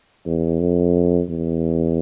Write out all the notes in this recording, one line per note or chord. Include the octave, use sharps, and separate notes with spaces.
E2
F2
E2